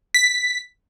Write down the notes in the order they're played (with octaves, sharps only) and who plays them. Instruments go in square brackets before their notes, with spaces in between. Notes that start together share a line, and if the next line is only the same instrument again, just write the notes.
[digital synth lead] B6